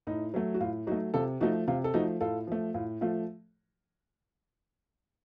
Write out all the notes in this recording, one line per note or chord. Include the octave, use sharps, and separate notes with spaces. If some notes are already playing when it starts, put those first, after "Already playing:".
A2 D#4
F#3 A3
F#4
A2 F4
F#3 A3 D#4 F#4
C3 F4 A4
F3 A3 D#4 F#4
C3 F4
A4
F3 A3 D#4 F#4
A2 F4 A4
F3 A3
A2 F4
F3 A3 F4